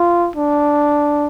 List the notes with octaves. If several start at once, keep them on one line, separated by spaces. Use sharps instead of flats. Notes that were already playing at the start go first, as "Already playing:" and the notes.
Already playing: F4
D4